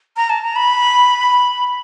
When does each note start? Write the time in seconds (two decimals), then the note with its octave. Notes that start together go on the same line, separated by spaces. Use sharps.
0.17 A#5
0.30 A5
0.43 A#5
0.56 B5